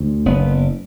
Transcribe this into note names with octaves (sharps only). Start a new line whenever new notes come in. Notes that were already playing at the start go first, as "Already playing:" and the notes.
Already playing: D2
F#1 B3